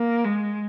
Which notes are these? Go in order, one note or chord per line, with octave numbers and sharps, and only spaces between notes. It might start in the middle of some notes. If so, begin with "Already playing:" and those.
Already playing: A#3
G#3